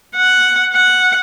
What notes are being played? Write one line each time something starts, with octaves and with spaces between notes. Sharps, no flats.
F#5
F#5